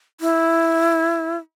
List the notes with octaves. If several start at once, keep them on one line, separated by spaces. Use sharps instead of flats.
E4